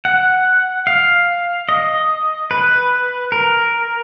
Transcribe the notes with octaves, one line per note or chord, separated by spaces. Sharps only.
F#5
F5
D#5
B4
A#4